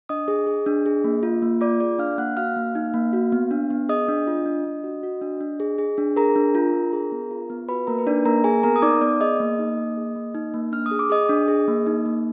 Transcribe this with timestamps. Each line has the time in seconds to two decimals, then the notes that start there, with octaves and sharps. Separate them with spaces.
0.09 D4 D#5 D#6
0.28 G#4
0.47 G#4
0.66 D4
0.86 G#4
1.04 A#3
1.23 F4
1.42 A#3
1.61 F4 D5 D6
1.80 G#4 D5 D6
1.99 D4 F5 F6
2.18 A#3 F#5 F#6
2.37 F#4 F5 F6
2.56 A#3
2.75 D#4
2.94 A#3
3.13 F#4
3.32 B3
3.51 D4
3.70 B3
3.89 G#4 D#5 D#6
4.09 D4
4.27 F4
4.46 D4
4.64 D4
4.84 F#4
5.03 F#4
5.22 D4
5.41 D4
5.60 G#4
5.78 G#4
5.98 D4
6.16 G#4 A#4 A#5
6.36 D4
6.55 F4
6.73 D4
6.93 G#4
7.12 B3
7.31 F4
7.50 B3
7.69 F#4 B4 B5
7.87 A#3 A#4 A#5
7.99 B4
8.07 D4 D#4 D5
8.25 A#3 A#4 A#5
8.44 G#4 G#5
8.63 B3 A#4 A#5
8.76 D#6
8.82 D#4 D5 D6
9.01 B3 D5 D6
9.20 G#4 D#5 D#6
9.40 A#3
9.59 D#4
9.78 A#3
9.97 G#4
10.16 A#3
10.35 D#4
10.54 A#3
10.72 D4 F6
10.86 D#6
10.91 G#4
10.99 D6
11.10 G#4 D#5 D#6
11.29 D4
11.48 G#4
11.68 A#3
11.86 D#4
12.06 A#3